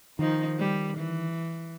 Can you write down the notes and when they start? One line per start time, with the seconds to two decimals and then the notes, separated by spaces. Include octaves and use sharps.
0.19 D#3 F3 D#4
0.59 G3
0.98 E3